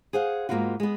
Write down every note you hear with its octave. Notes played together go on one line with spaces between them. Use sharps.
G#4 C5 F5 F#5
G#2 G3 A#3 B3 F4 F#4
G#3 B3